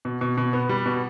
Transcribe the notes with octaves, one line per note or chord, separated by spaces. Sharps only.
B2
B2
B2
B3
G3
B2